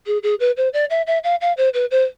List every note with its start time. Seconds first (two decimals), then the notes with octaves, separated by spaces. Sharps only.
0.06 G#4
0.23 G#4
0.40 B4
0.57 C5
0.73 D5
0.90 E5
1.07 E5
1.24 F5
1.41 F5
1.57 C5
1.74 B4
1.91 C5